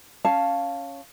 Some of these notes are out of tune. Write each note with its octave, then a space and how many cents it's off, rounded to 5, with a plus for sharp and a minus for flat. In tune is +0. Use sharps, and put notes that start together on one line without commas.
C#4 +0 F5 +0 A5 +0